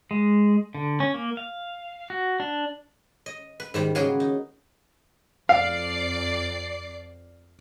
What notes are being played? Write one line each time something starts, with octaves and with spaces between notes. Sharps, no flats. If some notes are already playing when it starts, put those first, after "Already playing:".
G#3
D3
C#4
A#3
F5
F#4
D4
D#5
B4
G#2 D#3 G3
C#3 A#3 F#4 G#4 B4 G5
D#4
F2 D5 F5 C7